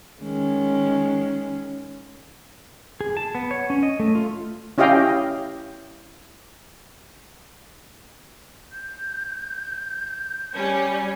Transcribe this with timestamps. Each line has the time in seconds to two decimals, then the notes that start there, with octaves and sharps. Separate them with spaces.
0.23 D#3 G#3 C#4
3.01 G#4
3.17 A5
3.35 B3
3.51 C#5
3.70 C#4
3.83 D#5
4.00 A3
4.15 F4
4.78 C#4 E4 G4 D#5 F5 G5
8.72 G6
10.55 G3 C#4